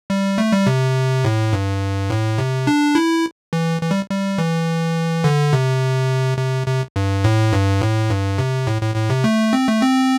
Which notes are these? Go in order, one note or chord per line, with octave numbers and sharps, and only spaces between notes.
G3
A3
G3
C3
A2
G2
A2
C3
D4
E4
E3
E3
G3
G3
E3
D3
C3
C3
C3
G2
A2
G2
A2
G2
C3
A2
A2
A2
C3
A3
C4
A3
C4